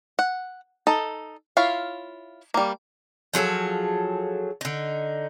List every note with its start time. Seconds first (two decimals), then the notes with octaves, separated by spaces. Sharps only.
0.19 F#5
0.87 D#4 A4
1.57 E4 F4 C#5 F5
2.54 G3 A#3
3.34 F3 F#3 G#4 A4
4.61 D3 D#4